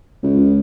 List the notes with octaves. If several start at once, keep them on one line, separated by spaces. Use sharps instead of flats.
C#2